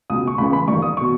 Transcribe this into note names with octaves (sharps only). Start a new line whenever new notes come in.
C#2 B2 D#6
C#6
C#2 C#3 E3 B5
B5
G1 G2 D#3 C#6
D#6
C#6
B2